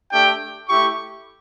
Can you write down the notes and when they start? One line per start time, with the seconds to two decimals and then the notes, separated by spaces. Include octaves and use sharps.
0.12 A3 D4 G4 G5
0.68 A3 E4 G4 C#6